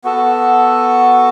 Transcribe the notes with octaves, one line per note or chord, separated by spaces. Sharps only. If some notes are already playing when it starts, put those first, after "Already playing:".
B3 F#4 A4